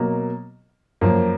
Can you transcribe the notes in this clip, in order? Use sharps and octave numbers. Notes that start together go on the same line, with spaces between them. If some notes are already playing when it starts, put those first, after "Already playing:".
Already playing: B2 F#3 A#3
F#2 F3 A#3